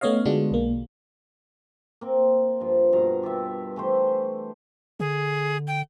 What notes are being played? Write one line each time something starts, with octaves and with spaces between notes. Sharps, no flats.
A3 B3 C#4 C#5 D#5 F5
D3 G#3 B3 D4 F4 F#4
B1 A#3
A#3 C4
G2 F3
G2 B2 A#5
F4 G4 D5 E5
E3 A3 G4 C5
D3 G#4
G5